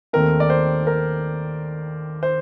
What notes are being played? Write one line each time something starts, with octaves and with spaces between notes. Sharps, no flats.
D#2 D#3 A3 C4 A#4
D5
C5
A#4
C5